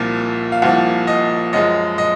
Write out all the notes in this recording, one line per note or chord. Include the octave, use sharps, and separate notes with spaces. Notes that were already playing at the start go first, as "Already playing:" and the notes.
Already playing: C2 A#2 F3
F5
C2 A#2 F3 F#5
D#5
F#2 F3 G#3 D#5
D#5